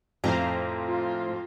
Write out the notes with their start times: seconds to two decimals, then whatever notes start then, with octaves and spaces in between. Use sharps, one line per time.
0.24 F2 A2 C5 F5 A#5
0.86 F4